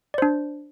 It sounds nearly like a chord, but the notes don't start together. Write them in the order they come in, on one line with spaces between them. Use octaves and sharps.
D5 C5 D4